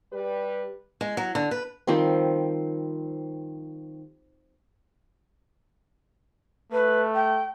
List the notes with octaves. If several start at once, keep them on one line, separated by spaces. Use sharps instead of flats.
G3 G4 B4
G#3
F#3
D3
B4
D#3 F3 G3 C4
A3 B4
G5